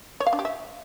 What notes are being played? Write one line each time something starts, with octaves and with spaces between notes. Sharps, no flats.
C#5
F5
D4
G4
E5